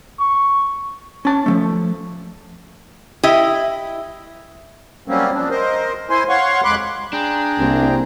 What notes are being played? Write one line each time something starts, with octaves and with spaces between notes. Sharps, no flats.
C#6
C#4 A5
F3 F#3 A3
E4 G4 D#5
F#3 G3 A#3 C4 C#4
F3 C4 D4
A#4 C5 D#5
E4 C5 G#5 C6
C#5 F5 F#5 C6 C#6
F2 G#3 B5 C6 D6 F#6
D4 G#4 G5 A#5
C2 A#3 C4